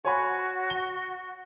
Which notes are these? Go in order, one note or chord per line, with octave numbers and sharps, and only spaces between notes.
F#4 C#5 G#5 B5
G7